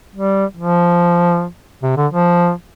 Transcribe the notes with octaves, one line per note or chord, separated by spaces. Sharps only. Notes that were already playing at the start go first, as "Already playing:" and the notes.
G3
F3
C3
D3
F3